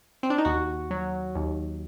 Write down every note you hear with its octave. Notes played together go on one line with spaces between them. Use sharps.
C4
D4
D#4
D#2 F#4
F#3
D#2